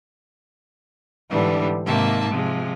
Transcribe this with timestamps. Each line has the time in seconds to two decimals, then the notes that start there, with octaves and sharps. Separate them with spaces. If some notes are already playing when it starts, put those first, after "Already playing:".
1.30 G#2 D3 E3 G3 B3 D4
1.86 G#2 C3 D#3 A#3 E5 A5
2.31 C3 F3 G#3